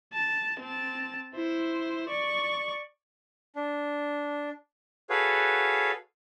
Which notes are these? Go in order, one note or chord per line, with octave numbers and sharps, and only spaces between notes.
A5
C4 A5
E4 C5
D5 C#6
D4
F#4 G#4 A4 B4 C#5 F5